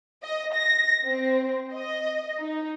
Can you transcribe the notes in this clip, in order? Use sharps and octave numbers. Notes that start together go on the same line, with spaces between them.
D#5
A#6
C4
D#5
D#4